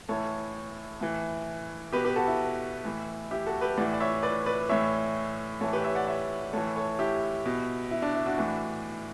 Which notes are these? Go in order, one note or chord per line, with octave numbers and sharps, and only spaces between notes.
A2 E3 A4 C#5
A2 E3
B2 G4 B4
G4 B4
F#4 A4
E4
A2 E3
E4 G4
F#4 A4
G4 B4
A2 E3 D5 F#5
D5
C#5 E5
B4 D5
B4 D5
A2 E3 C#5 E5
A2 E3 A4 C#5
G4 B4
C#5 E5
D5 F#5
C#5 E5
A2 E3 A4 C#5
A4 C#5
E4 G4
B2
E4
D4
E4
D4 F#4
A2 E3